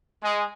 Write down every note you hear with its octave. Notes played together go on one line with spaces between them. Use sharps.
G#3